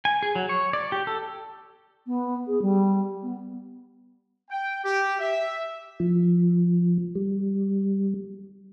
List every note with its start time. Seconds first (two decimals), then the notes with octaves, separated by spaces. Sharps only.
0.05 G#5
0.23 G#4
0.36 F#3
0.49 C#5
0.73 D5
0.92 G4
1.07 A4
2.07 B3
2.47 G#4
2.62 G3
3.23 B3
4.50 G5
4.84 G4
5.19 E5
6.00 F3
7.15 G3